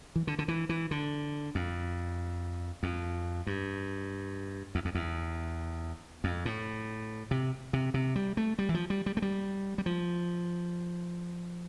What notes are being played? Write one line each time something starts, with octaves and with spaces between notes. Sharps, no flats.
E3
D3
D3
E3
E3
D3
F2
F2
G2
E2
F2
E2
F2
A2
C3
C3
C3
G3
A3
G3
E3
F3
G3
G3
A3
G3
G3
F3